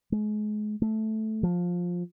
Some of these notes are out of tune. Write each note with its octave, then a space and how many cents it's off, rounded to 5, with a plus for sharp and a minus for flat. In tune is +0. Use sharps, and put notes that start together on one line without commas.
G#3 +35
A3 -10
F3 +15